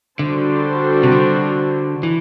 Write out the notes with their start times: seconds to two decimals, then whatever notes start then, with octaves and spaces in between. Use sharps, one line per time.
0.19 D3 G3 D4 F#4 A4 C5
1.03 C3
1.12 D3
2.03 E3